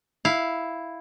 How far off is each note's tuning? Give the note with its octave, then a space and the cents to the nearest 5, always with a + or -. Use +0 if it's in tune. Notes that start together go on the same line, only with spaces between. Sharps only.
E4 +0 F5 +0